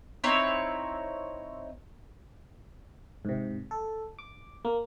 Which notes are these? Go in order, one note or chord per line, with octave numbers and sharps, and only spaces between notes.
C4 D#4 E4 C#5
G#2 C3
A4
D6
A#3